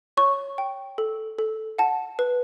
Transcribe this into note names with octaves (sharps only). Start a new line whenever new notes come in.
C#5 C#6
G5
A4
A4
F#5 A5
B4